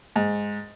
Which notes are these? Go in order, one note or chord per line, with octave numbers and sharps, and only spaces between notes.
G#2